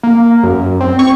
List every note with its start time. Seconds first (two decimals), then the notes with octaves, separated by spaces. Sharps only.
0.03 A#3
0.43 F#2
0.80 C4
0.99 C#6